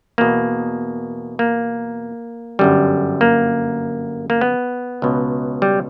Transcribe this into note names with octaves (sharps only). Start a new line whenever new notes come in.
E2 B2 A#3
A#3
G1 F#2 D3 G3
A#3
A#3
B3
C#2 B2
G3